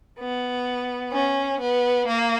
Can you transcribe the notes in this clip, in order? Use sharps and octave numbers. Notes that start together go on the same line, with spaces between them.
B3
C#4
B3
A#3